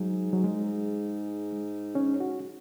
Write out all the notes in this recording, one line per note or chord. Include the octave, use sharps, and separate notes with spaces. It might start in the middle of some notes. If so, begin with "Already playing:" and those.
Already playing: G#2 F#3
F#3
G#3
C#4
F#4